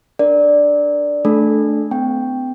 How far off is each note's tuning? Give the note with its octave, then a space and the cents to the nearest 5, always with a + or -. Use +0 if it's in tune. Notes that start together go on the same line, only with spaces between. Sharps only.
D4 +0 A#4 +0 D5 +0
A3 +0 D4 +0 A4 -20
C4 -45 G5 +0